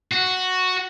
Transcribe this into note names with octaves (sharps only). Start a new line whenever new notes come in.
F#4